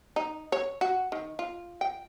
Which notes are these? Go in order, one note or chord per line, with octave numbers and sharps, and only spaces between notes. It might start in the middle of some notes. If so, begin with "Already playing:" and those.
D#4
C#5
F#4
D#3
F4
G5